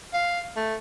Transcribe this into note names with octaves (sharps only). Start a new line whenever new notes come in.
F5
A3